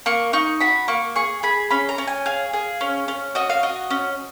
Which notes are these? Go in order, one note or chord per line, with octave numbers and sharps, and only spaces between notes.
A#3 C#6
D#4 C#6
F#4 B5
A#3 C#6
G#4 C#6
G#4 B5
C#4 B5
A#5
C#4
G#5
G#4 F5
G#4
C#4
C#4
F#4 D#5
F5
F#4 D#5
C#4